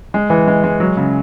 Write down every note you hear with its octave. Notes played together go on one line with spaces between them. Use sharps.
G#3
E3
G#3
G#3
F#3
C#3